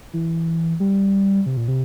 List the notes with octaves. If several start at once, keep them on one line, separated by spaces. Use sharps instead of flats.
E3
G3
C3
A#2
C3